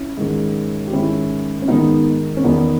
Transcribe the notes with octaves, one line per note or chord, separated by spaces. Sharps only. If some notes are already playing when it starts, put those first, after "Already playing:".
Already playing: C#4 E4
G#2 D#3
G4
G#2 D#3 C#4 E4
C#4
G#2 D#3 B3 D#4
C#4
E2 D#3 B3 D#4